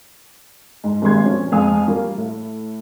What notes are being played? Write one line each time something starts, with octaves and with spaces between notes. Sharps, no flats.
G#2
G#1 G2 A#2 G#3 C6 G#6
A#2 F3 C#4
F2 G#3 F5 G#5 D#6
G3 A#3 F4
A2